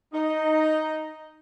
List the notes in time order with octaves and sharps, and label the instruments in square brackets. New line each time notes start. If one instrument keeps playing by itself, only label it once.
[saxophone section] D#4